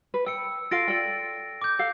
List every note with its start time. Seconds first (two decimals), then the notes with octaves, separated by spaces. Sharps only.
0.14 B4
0.26 G5 E6 C#7
0.71 F4 A4 F5 A6 A#6 D7
0.88 A4 D5 G5
1.62 D6 G6
1.79 A4 F5